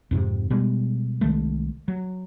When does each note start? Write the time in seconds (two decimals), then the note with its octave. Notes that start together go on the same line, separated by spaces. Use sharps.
0.11 F2 G#2 C3
0.50 B2 G3 G#3
1.21 C2 D#3 G#3 A3
1.88 F#3